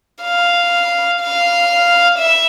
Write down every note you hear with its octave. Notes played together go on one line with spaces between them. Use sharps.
F5
F5
E5